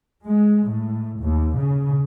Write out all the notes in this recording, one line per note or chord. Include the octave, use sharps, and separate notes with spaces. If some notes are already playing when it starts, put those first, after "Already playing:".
G#3
A2
D#2
C#3